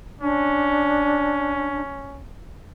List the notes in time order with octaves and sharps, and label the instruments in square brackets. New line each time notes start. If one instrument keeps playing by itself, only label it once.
[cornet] C#4 [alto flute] D4